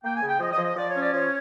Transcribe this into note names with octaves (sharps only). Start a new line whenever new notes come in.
A#3 G5
G#5
C#3
G5
F3 D#5
D#5
F3
D#5
F3 D5
C#5
C#4
D5
F3 C#5